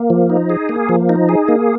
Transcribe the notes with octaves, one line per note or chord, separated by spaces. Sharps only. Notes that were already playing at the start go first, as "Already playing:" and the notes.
Already playing: A#3
F3
D#4
G#4
A#3
F3
D#4
G#4
A#3